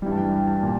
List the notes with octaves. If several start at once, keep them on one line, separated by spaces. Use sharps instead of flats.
G2 E3 G3 G5
A5
G5
G5
A5
A#2